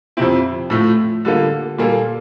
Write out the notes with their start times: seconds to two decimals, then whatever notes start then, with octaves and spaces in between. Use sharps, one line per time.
0.17 F2 C3 F3 C4 E4
0.70 A2 F3 A3
1.25 D3 G3 A#3 F4 A4
1.78 A#2 G3 A#3 F4 A4